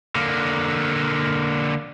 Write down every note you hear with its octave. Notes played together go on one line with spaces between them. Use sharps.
D3 A#3